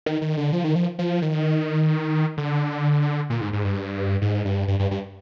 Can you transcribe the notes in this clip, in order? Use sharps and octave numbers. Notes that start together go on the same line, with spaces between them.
D#3
D#3
D3
F3
D#3
F3
F3
D#3
D3
A#2
G#2
G#2
G2
G#2
G2
G2
G2
G2